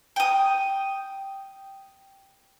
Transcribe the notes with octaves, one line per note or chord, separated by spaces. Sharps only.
G5 D#6